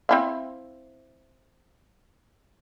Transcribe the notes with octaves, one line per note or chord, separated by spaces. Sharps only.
C4 E4 F5